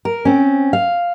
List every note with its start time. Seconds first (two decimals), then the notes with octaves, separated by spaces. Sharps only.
0.05 A#4
0.25 C4 C#4
0.73 F5